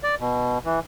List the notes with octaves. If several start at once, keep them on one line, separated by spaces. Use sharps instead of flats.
D5
B2
E3